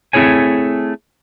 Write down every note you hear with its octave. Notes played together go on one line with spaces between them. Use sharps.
A3 C4 E4 G#4 C#5 G#5